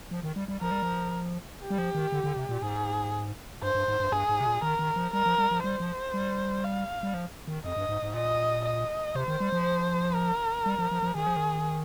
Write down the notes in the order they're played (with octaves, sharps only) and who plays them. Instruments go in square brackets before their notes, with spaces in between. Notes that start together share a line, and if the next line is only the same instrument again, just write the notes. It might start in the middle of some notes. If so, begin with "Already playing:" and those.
[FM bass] F3
D#3
G3
G3
[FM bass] F3 [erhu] A#4
[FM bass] G3
F3
[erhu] G4
[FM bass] G3
F3
D#3
D3
D3
C3
A#2
[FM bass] G#2 [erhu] G#4
[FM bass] G2 [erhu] C5
[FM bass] G2
G#2
G2
[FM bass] G2 [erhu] G#4
[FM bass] G#2
C3
A#2
[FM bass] D#3 [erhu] A#4
[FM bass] D#3
F3
[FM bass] G3 [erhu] A#4
[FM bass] F3
G3
F3
[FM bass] G3 [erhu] C5
[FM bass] F3
G3
[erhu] F5
[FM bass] G3
F3
D#3
[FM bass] F2 [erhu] D#5
[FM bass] G2
G#2
G#2
[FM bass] A#2 [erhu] D#5
[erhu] D#5
[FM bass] C3 [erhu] C5
[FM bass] D#3
G3
F3
[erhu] A#4
[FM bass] G3
F3
F3
F3
[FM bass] D#3 [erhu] G#4
[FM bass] F3
D#3